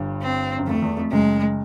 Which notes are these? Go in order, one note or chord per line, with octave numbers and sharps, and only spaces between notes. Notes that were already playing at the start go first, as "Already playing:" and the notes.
Already playing: G1 G2
C4
F#2
F2 A3
E2
F2
F#1 F#2 G#3